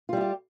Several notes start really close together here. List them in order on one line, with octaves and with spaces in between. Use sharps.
F4 G3 E4 G4